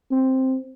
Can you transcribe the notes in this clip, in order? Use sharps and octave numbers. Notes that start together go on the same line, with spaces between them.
C4